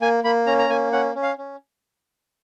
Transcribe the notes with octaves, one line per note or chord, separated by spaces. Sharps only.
A#3 G#5
A#3 B5
C#4 A#5
A#5
A#3 G#5
C#4 F#5
C#4
F5
C#4